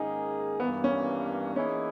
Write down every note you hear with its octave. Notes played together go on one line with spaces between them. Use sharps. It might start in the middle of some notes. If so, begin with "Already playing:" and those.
Already playing: G#2 D#3 A#3 C#4 D#4 G#4
G2 E3 A#3 B3
C#4
E3 A#3 C#4 D#4 G#4